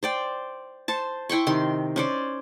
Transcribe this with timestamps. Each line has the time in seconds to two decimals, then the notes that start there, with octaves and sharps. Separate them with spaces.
0.03 C5 D5 G5
0.88 C5 A5
1.29 E4 G5 C6 C#6
1.47 C3 D#3 C6
1.96 C#4 C5 D5